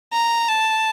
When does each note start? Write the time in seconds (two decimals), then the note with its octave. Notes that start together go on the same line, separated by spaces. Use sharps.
0.13 A#5
0.48 A5